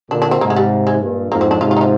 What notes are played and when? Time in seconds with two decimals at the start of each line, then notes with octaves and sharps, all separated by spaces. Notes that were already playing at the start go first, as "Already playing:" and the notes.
0.11 A#2 D3 D4
0.22 D4
0.31 C4
0.41 G#2 C3 A#3
0.50 G#3
0.56 G3
0.87 G#3
1.01 G2 A#2
1.31 F2 G#2 A#3
1.41 C4
1.51 D4
1.61 G#2 C3 F4
1.71 F4
1.76 D#4
1.81 F4